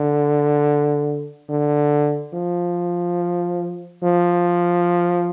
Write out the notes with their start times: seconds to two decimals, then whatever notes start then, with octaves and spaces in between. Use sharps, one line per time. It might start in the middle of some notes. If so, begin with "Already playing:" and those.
Already playing: D3
1.49 D3
2.34 F3
4.03 F3